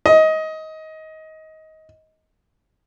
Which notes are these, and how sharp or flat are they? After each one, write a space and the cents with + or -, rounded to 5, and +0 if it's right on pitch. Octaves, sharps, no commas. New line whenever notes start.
D#5 +20